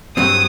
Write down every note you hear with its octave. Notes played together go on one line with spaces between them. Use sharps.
G2 F#3 C4 D#6